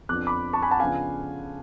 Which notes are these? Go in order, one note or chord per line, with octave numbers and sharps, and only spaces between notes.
F2 F3 B3 D4 D6 F#6
B5 D6
A5 C#6
G#5 B5
F#5 A5
C#3 F3 B3 D4 F5 G#5